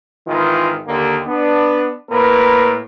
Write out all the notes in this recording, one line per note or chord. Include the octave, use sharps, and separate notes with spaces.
G#1 D#3 E3 F4
D#2 D3 A#3 G4
B3 D4
A2 A#3 A#4 B4